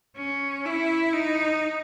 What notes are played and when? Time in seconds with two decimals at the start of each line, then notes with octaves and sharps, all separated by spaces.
0.17 C#4
0.66 E4
1.13 D#4